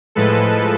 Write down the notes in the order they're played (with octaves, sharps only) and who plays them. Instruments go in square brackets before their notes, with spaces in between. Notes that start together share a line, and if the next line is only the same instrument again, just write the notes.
[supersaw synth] A2 F3 G#3 A4 B4